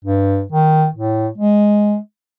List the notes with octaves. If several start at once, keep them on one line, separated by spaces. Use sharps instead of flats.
G2
D#3
A2
G#3